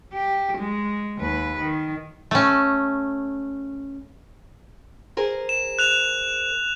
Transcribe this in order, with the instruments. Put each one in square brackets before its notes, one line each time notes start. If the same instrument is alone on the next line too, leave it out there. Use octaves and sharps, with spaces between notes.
[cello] G4
G#3
D#2 B4
D#3
[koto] A3 C#4
[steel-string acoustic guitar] G#4 A#4 C5
[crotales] E7
F#6 F7